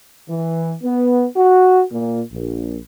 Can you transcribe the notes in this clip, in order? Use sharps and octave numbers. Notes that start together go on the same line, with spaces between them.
E3
B3
F#4
A#2
A#1